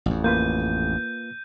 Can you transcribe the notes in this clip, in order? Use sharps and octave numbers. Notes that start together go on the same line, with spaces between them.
A1 F2
A#3 F4 B4 G6 D#7